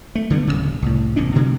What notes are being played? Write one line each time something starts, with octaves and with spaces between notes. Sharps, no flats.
A3
D3 G3 A#3 B3
D1 E2 C#3
C2 A2
F1 E2 C#4 D4
B2 D3 F#3 G#3